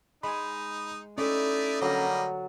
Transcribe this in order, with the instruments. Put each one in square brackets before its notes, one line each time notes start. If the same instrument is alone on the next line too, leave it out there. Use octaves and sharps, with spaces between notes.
[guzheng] G#3 G#5 [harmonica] D#4 [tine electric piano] B5
[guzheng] A3 G4 [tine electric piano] C#4 A4 [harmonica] D#4 E4 D5
[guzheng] D3 [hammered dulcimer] F#3 [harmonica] G3 A#3 D#5